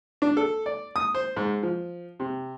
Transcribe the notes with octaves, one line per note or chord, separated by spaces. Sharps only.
D4
A4
D5
D#6
C5
G#2
F3
C3